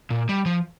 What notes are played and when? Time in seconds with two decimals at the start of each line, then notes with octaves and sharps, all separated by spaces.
0.10 A#2
0.29 G3
0.46 F3